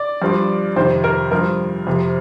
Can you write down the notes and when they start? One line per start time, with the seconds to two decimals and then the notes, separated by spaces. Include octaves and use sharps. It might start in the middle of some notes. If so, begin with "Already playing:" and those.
Already playing: D5
0.22 G2 F3
0.76 F2 C3 D#3 C5
1.04 A#4
1.31 G2 F3 A#4
1.87 F2 C3 F3